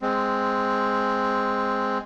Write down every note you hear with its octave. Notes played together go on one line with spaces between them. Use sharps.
G#3 C4